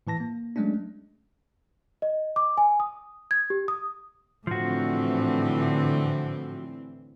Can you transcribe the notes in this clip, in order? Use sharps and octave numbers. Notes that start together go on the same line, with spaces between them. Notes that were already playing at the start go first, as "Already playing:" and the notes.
A2 E3 A5 A#6
A#3
F#3 G#3 A3 C#4 D4
D#5
D6
G#5
D#6
G#6
G4
D#6
A2 D3 E3 F3 C4 F#4